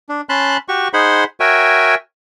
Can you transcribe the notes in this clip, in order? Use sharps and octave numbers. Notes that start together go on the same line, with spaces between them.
D4
C#4 A5 B5 C6 F#6
F#4 G4 C#6
D#4 G#4 C5 F#5 B5 C6
F#4 A#4 C#5 E5 G5 G#5